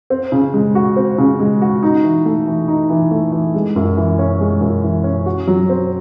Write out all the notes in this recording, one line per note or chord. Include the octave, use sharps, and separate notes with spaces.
C4
C#3
G#3
F#4
C4
C#3
G#3
F#4
D#4
E3
A3
E3
D#4
E3
A3
E3
G#3
F#2
E3
C#4
G#3
F#2
E3
C#4
F#4
F#3
C4